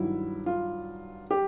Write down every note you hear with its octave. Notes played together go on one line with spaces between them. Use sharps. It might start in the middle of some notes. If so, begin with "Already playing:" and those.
Already playing: G2 D#3 F#3 E4
F4
G4